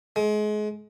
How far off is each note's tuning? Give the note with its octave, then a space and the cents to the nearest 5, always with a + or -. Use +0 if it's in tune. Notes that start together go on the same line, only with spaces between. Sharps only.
G#3 +30